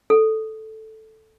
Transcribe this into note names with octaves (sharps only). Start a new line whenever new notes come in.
A4